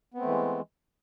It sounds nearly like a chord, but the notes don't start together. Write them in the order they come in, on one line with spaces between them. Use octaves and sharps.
B3 C4 A3 E3 G#3